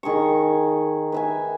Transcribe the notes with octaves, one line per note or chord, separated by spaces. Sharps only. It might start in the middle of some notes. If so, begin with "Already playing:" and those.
D#3 G#4 A#5 C#6
B4 E5 G#5